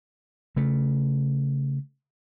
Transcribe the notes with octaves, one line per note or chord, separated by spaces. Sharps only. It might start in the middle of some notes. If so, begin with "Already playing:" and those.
C#3 A3